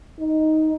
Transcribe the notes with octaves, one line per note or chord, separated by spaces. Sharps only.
D#4